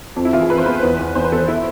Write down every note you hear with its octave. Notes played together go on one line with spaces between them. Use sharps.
F2
E4
E3 F4
G#4
F2 B4
C5
B3 B4
E2 B4
E2
E2 C5
B4
B3 A4
E4